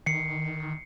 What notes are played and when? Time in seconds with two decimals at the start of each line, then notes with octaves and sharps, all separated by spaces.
0.06 D#3 C7 C#7